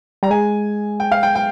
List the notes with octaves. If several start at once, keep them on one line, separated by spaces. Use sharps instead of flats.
G3 A#5
G#3 G#5
G5
F5
G5
G5